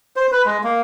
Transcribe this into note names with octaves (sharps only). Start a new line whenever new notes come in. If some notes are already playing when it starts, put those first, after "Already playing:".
C5
B4
G#3
A#3